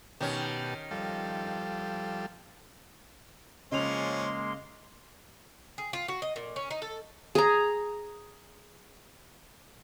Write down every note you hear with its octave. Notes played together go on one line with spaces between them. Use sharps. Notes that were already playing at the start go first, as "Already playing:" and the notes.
B2 D#3 C#4 G4 A5
F3 G3 A4
C#3 F3 G#3 A#3 C#4 D#5 C6 F7
G#4
F4
F#4
D#5
A#2
C#4
D#4
A4
G#4 A#5